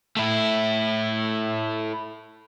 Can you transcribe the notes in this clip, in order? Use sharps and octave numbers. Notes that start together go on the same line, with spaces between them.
A3 E4